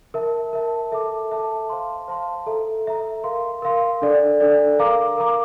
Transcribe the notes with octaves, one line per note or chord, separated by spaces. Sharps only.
A#4 E5 A5
A#4 E5 A5
A4 E5 A5 D6
A4 E5 A5 D6
C5 F5 A5 C6
C5 F5 A5 C6
A4 E5 A#5
A4 E5 A#5
A#4 F5 C6
A#4 F5 C6
D4 A4 D5
D4 A4 D5
A#4 F5 A#5 D6
A#4 F5 A#5 D6